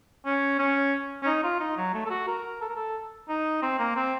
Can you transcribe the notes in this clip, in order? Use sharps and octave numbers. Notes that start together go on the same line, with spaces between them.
C#4
C#4
C#4
D#4
F4
D#4
F#3
A3
A4
F#4
A#4
A4
A#4
A4
D#4
C4
A#3
C4